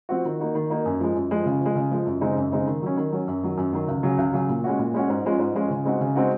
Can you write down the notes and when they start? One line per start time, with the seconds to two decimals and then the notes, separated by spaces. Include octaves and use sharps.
0.09 F3 C4 F#4
0.25 D#3
0.40 A#3 D#4 F#4
0.55 D#3
0.70 A#3 D#4 F#4
0.86 F#2
1.00 F3 G#3
1.15 F#2
1.31 F3 G#3
1.46 C#3
1.61 F3 G#3
1.75 C#3
1.91 F3 G#3
2.06 F#2
2.21 C#3 G#3 C4 D#4
2.36 F#2
2.52 C#3 G#3 C4 D#4
2.67 D#3
2.82 F#3 C#4
2.97 D#3
3.12 F#3 C#4
3.27 F#2
3.43 D#3 F#3
3.57 F#2
3.73 D#3 F#3
3.88 C#2
4.03 C#3 F#3
4.18 C#2
4.33 C#3 F#3
4.49 A#2
4.64 G#3 C#4 F#4
4.79 A#2
4.94 G#3 C#4 F#4
5.10 G#2
5.24 F3 G#3 C#4 F4
5.39 G#2
5.55 F3 G#3 C#4 F4
5.70 C#3
5.85 G#3 C4 D#4 F#4
6.01 C#3
6.16 G#3 C4 D#4 F#4